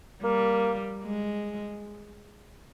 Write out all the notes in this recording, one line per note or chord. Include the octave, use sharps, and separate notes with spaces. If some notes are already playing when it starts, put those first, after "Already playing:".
G3 A#3
G#3